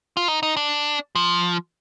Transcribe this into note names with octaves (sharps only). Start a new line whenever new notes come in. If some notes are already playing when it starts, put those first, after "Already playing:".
F4
D#4
D#4
D4
F3